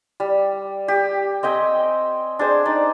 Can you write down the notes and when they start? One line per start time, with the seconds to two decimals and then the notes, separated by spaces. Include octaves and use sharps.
0.20 G3
0.88 G4
1.43 C4 D#5 G5 G#5
2.39 D4 G#4 C5
2.65 D#4 D5